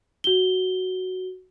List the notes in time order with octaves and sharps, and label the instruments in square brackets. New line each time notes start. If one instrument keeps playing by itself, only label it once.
[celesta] F#4 G7